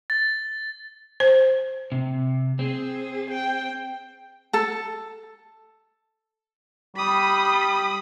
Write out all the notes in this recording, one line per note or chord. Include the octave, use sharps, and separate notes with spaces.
A6
C5
C3
C4 G#4
G5
A4 A5
G3 B5 D#6